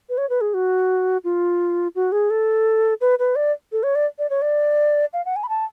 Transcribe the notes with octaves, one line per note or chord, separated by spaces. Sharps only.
B4
C#5
B4
G#4
F#4
F4
F#4
G#4
A4
B4
B4
D5
A4
C#5
D5
D5
C#5
D5
F5
F#5
G#5
B5
A5